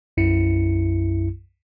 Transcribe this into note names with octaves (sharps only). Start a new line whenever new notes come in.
B1 F#2 E4 C#7